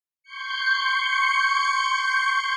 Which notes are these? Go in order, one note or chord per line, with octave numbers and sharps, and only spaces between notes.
C6 C#6 G6 C#7